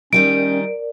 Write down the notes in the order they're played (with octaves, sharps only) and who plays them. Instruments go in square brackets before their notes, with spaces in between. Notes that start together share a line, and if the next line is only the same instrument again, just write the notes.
[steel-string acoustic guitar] D#3 G3 D#4 [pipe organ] C#4 [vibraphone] A#4 D5 [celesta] D7